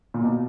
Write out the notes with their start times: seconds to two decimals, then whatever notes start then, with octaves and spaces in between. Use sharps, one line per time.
0.14 A#2
0.23 B2